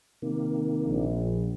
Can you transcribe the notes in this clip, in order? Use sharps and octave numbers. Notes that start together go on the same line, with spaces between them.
C3 D#3 A#3
A#1